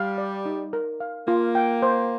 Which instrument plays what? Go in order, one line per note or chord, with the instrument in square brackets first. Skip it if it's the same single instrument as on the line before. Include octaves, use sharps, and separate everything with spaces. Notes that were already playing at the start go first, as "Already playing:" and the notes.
Already playing: [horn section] G3 [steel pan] F5
[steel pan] D5
D#4
A#4
F5
[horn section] A#3 [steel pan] F4
[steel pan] G5
C5